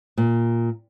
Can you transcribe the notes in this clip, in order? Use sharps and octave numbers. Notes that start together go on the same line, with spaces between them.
A#2